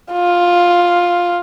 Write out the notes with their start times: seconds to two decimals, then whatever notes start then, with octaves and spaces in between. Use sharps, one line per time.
0.12 F4